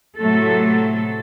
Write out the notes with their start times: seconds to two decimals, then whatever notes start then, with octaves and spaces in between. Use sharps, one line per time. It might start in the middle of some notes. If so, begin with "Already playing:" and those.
0.18 A2 C3 F#3 A3 A4